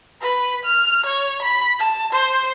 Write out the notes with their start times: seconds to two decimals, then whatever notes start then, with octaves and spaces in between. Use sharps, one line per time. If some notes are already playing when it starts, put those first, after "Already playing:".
0.22 B4
0.65 F6
1.06 C#5
1.42 B5
1.79 A5
2.13 C5